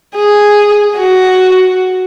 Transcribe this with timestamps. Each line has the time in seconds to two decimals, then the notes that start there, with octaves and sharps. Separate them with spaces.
0.15 G#4
0.97 F#4